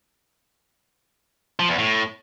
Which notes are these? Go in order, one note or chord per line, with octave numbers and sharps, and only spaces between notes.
F3
E2
A2